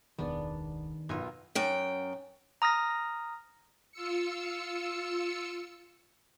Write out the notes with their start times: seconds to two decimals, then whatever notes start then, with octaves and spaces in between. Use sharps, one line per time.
0.19 E1 C#2 D#3 B3 D4 G#4 D5
1.09 B1 F#2 D#4 F4 A#4 G#5
1.55 F#2 G5
2.62 A#5 D#6 F6 A#6
3.92 F4 E6 C#7